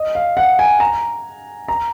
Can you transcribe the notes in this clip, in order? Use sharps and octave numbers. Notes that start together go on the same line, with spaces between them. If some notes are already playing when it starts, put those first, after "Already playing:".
Already playing: D#5
F5
F#5
G#5
A#5
A#5